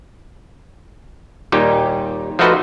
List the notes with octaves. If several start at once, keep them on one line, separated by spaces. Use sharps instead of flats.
D#2 A#2 G3 D#4 G4
F3 A3 D#4 F#4 B4 C5